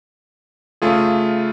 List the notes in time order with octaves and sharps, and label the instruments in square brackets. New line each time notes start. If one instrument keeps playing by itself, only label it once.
[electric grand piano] C#3 A3 F4 G#4